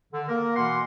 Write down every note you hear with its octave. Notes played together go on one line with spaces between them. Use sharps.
D3
A#3 A#4
B2 E3 A#3 F#5 C6